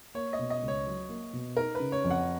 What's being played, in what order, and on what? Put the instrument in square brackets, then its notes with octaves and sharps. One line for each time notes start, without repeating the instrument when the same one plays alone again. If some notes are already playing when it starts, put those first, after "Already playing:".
[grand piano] A#3 [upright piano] C#5
[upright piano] D#5
[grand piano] B2
[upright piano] D#5
[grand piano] C#2
[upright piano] C#5
[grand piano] F#3
A#3
B2
[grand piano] D#4 [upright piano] A#4
[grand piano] C#3 [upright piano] B4
[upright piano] C#5
[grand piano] F2
[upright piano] F#5